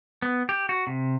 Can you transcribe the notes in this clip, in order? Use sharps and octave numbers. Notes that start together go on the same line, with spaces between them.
B3
G4
F#4
C3